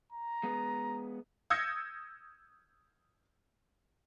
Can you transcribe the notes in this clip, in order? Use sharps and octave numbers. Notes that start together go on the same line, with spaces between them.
A#5
G#3 B3
D#6 E6 G6 G#6 A#6 C#7